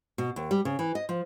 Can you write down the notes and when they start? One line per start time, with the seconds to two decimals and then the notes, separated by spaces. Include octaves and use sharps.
0.18 B2
0.36 D#2
0.51 G3
0.65 C#3
0.79 E3
0.95 D#5
1.09 F3